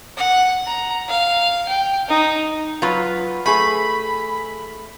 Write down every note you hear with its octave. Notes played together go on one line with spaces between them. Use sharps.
F#5
A#5
F5
G5
D#4
F#3 F4 B4
A3 G#4 B5